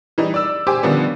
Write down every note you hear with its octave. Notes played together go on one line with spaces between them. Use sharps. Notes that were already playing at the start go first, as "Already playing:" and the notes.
E3 G3 D#4
D5 E6
G4 C5 G#5 D6
D3 D#3 F3 G3 B3 C#4